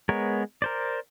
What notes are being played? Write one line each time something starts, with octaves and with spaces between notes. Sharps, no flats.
G#3 B3 A#4 C#5
A#4 C5 D5